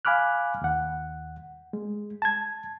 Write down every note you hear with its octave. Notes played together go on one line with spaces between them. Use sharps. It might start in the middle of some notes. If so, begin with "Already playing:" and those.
F5 G#5 B5 D6 F6 F#6
D#2 F#5
G#3
A5 G#6